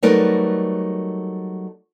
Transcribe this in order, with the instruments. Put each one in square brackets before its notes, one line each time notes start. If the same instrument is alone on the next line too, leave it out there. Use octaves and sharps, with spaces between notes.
[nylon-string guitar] F#3 G3 A3 D#4 A#4 B4